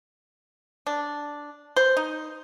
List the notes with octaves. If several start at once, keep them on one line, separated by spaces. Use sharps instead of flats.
D4
C5
D#4